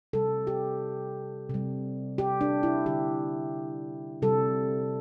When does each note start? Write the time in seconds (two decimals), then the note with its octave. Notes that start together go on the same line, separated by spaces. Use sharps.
0.13 C3 G3 A4
0.47 G4
1.50 C3 G3
2.18 G4
2.41 D4
2.63 E4
2.86 D3 G3 G4
4.22 C3 G3 A4